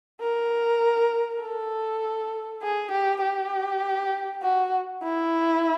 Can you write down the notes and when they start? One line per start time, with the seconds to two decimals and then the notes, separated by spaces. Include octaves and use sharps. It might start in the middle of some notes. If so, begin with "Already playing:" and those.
0.21 A#4
1.42 A4
2.63 G#4
2.92 G4
3.22 G4
4.43 F#4
5.03 E4